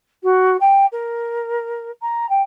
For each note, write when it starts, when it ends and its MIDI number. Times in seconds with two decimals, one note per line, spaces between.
0.23 0.56 66
0.60 0.86 79
0.92 1.90 70
2.02 2.28 82
2.29 2.42 79